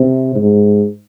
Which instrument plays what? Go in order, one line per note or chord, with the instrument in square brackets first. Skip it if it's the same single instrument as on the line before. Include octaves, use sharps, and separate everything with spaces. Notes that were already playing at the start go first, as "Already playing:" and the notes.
Already playing: [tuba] C3
G#2